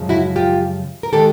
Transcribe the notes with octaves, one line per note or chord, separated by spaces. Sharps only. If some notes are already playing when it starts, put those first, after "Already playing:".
Already playing: F#2 C#3 F3 G#3
E4 F#4
F4 G4
A#4
D#3 G#3 G4 A4